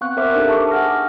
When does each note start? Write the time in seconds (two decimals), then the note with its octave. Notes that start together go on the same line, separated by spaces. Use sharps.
0.01 B3 C4 F5 C#6 F#6
0.17 A#4 C5 E5 D6
0.35 D4 D#4 G4 A4
0.49 A5 C#6 D6
0.71 G#4 F#5 F6 A#6